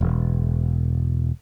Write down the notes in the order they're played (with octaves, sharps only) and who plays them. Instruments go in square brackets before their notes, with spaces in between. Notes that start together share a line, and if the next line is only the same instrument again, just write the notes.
[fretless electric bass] E1